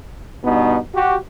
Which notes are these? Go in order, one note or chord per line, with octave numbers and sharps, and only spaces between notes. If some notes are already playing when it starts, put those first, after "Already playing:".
G2 B2 B3 D#4
F#4 G4